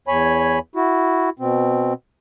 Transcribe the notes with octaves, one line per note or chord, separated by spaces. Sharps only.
E2 C#5 G#5 B5
E4 F#4
B2 C4